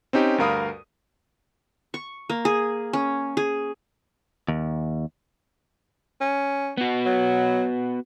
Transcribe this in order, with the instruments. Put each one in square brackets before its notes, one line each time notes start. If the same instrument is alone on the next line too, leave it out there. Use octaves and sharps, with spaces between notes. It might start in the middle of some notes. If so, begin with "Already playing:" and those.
[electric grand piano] C4 C#4 D#4 G4
D2 G2 A#4 F5 B5 D#6
[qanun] C#6
A#3
G#4
C#4
G#4
[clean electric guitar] D#2
[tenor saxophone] C#4
[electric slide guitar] B3 F#4
[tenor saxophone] F#3